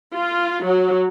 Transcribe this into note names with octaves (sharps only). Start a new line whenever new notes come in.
F4
F#3